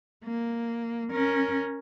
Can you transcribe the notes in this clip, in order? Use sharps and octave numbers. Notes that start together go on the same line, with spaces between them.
A#3
C#4 A#4